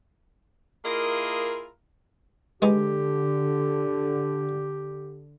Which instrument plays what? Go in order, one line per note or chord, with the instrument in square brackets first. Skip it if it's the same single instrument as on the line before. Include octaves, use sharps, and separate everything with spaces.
[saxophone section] A#3 E4 F4 G#4 A#4 D#5
[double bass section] D3 [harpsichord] G#3 B3 D#4 [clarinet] G4